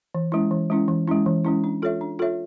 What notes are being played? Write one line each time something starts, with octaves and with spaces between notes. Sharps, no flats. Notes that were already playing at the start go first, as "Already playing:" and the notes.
E3
G#3 C#4 E4
E3
G#3 C#4 E4
E3
G#3 C#4 E4
E3
G#3 C#4 E4
D4
F4 A4 C#5 E5
D4
F4 A4 C#5 E5